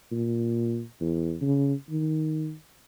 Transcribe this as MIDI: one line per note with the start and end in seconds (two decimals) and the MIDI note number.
0.12 0.82 46
1.01 1.37 40
1.41 1.73 49
1.90 2.53 51